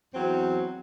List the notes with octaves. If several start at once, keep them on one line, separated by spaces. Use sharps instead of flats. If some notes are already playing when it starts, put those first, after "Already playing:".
E2 F#3 C4